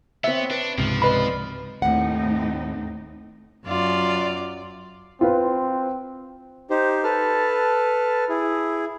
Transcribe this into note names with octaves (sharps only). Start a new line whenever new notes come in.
B3 C4 C#5 E5
D4 B4
C#2 G#2 C3 F3
B4 D5 D#5 B5
D#2 A2 C4 D#4 F#5
F#2 F4 D5
C4 F4 B4
D#4 G4 C5
A4 B4 A5 F6
E4 G#4